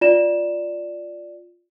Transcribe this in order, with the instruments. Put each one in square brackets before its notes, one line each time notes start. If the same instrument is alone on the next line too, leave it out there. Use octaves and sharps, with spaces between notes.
[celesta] F4 D5 E7